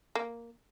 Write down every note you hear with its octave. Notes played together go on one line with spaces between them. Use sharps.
A#3